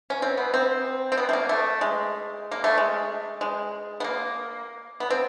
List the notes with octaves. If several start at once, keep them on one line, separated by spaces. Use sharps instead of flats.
C#4
C4
B3
C4
C4
B3
A3
A#3
A3
G#3
A#3
A3
G#3
G#3
B3
A#3
B3
C4